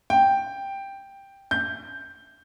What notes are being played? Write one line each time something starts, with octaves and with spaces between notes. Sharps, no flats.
G5
G6